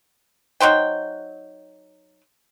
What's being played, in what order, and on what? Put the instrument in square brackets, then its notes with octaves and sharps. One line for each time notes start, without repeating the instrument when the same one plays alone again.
[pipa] F#3 D#4 C5 G5